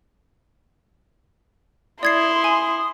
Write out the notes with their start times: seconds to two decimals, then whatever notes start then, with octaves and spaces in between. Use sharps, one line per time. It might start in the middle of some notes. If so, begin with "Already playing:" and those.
2.03 E4 D5 C6 D#6 G#6 C7
2.44 G#5